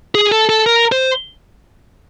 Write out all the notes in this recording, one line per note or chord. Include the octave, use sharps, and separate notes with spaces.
G#4
A4
A4
A#4
C5